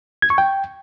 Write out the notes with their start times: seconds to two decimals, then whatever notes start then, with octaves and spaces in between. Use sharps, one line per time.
0.22 G#6
0.30 C#6
0.38 G5